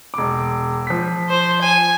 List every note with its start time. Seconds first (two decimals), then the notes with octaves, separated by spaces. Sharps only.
0.14 E1 D6
0.87 F3 B6
1.29 C5
1.62 G#5